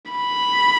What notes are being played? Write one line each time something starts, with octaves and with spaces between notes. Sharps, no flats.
B5